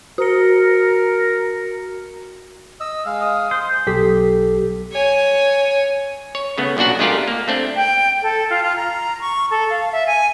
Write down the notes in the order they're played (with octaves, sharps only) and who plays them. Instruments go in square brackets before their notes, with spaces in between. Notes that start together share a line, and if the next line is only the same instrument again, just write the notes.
[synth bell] F#4 C#7 [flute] A#4
[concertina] D#5 E6
G#3 F5
[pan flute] D#6
[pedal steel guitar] C5
[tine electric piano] B1 G4 A4 B6
[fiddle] C#5 G#5
[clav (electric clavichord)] C#5
C#3 A3 B3
B1 A#2 D4 F#4 F#5
G#3 A3 D4 F4 G4 A#4
A#3
A3 C4 D4
[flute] G5
A4
F4
F4
A#5
C#6
A4
F5
E5
G#5